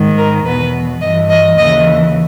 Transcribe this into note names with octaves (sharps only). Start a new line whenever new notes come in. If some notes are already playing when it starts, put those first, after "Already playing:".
Already playing: G#2 D#3
A#4
E2 B2 B4
G2 E3 D#5
D#5
D#2 C#3 E3 D#5